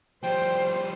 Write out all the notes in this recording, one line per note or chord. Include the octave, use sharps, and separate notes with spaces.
F3 G3 C5 G5